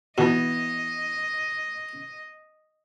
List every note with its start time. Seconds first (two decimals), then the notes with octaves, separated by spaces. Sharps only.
0.18 B2 E3 B3 D#5